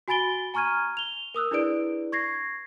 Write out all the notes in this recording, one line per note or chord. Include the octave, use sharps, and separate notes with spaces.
F#4 G#5 B5 A6 D7 G7
G#5 A#5 C#6 F6 G#6 D#7
F7 G7
A#4 D#6 E6 F#6
D4 E4 G#4 B4 D5 D7
C#6 G#6 A#6 C7